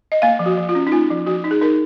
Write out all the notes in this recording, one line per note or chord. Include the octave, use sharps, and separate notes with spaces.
D#5
A#3 F5
F3
F#4
F3
F4
C#4
D#4
A#3 F4
F3
F3 F#4
D#4
G#4
D#4 A#4